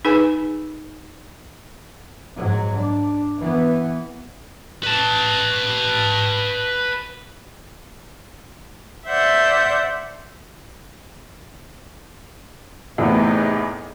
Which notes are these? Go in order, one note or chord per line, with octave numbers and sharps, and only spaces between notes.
D#4 G#4 B4 G#5
G#2 F#3
D4
E3 B3
B4 A5
C5 D5 E5 F#5 G6
E2 A2 C3 E3 B3 D#4